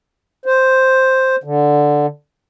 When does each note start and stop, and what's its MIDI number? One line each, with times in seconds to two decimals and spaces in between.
0.46 1.36 72
1.44 2.06 50